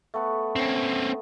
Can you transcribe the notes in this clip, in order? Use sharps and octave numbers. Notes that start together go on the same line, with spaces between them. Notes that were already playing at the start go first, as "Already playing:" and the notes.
A3 B3
C4 C#4